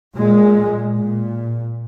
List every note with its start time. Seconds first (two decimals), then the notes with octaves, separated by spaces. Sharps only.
0.16 A#2 G#3
0.98 A#2